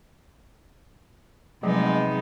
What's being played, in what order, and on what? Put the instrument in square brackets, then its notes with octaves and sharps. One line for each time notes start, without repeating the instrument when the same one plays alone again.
[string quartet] C3 B3 D#4 [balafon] F3 F#3 A3 [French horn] G#3